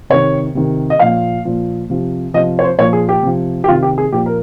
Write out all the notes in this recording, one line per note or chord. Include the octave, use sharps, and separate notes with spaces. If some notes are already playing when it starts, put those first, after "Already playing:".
C3 D#3 C#5
C3 D#3
D#5
A#2 F3 F5
A#2 F3
C3 F3
C3 F3 D#5
C#5
C5
A#2 F3 C#5
G#4
G4
C3 F3
G4
C3 D#3 F4
G4
G#4
A#2 F3 G4
A#4